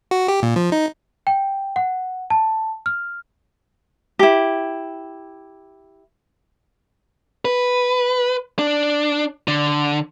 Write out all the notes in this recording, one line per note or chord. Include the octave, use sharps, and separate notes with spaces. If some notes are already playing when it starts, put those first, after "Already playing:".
F#4
G4
A#2
F3
D#4
G5
F#5
A5
F6
E4 G4
B4
D4
D3